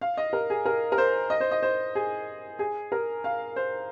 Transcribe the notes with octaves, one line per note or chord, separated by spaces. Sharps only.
F5
D#5
A#4
G#4
A#4
A#4
C5
D#5
C5
D#5
C5
G#4
G#4
A#4
F5
C5